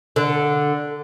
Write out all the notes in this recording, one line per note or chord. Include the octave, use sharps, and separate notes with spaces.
D3